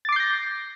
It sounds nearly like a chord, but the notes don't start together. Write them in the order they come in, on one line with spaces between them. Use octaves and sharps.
A6 D6 C7 G6 A#6